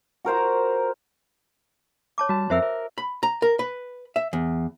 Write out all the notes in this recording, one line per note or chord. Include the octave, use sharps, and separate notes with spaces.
F#4 A#4 C5 A#5
C#5 A5 D6
G3 F#4 A5
F2 C4 A#4 C5 E5 E6
A#4
B5
A#5
A#4
B4
E5
E2